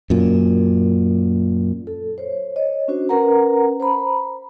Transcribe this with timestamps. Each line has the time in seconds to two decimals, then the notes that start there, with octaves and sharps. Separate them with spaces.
0.10 F#2 A#2
1.87 A4
2.18 C5 C#5
2.56 C#5 D#5
2.88 C#4 D4 F#4 C5
3.09 C#4 A#4 B4 F#5 A#5
3.80 C5 A#5 B5